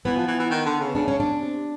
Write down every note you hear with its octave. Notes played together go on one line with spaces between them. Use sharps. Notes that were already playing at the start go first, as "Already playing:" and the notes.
E3 B3
F3
E3
E3
D#3
D3
C#3
C#3 D4
C#4
D4
C3